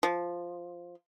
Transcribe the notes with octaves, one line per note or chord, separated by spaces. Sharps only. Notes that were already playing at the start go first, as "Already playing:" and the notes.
F3